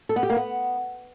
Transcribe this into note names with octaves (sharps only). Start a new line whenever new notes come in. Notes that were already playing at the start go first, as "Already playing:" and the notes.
A4
B3
G4
A#3
B3